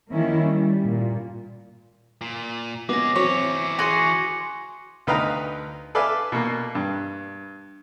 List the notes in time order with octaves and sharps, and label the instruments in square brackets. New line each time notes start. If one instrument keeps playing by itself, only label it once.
[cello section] D#3 F3 A#3 C#4 E4
G3
A#2
[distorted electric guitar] A#2
[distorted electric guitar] G#3 C#4 [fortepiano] B3 [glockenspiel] D6 A#6
[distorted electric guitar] E3 C#4 [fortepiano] F#3 C4 [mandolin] C#5
[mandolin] F#4 G#4 [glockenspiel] G#5 C6 C#7
[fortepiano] D2 D#4 B4 F5 G5 A#5
A4 B4 D5 E5 F5 G#5
B2 A#3
G2